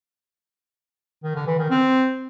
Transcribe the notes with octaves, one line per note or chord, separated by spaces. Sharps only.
D#3
D3
E3
D#3
C4